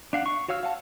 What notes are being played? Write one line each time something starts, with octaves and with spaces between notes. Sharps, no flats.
D4 F5 F#5
C#6
F#4 C#5 F5 E6 F6
F5 F#5 A5